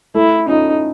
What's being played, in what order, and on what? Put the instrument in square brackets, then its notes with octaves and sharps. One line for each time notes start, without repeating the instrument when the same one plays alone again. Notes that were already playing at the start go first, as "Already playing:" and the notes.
[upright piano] A3 [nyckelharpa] E4
[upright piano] C#4 F4 [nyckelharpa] D#4